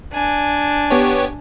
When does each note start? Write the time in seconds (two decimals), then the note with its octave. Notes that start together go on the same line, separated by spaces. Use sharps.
0.13 D4 G#5
0.91 B3 G4 C#5